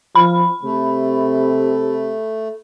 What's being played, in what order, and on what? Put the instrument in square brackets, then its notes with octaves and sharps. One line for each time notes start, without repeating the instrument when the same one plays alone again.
[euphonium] F3 [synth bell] B5
[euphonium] C3 [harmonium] A3